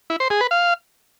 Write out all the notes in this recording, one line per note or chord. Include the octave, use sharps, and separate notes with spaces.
E4
C5
G#4
B4
F5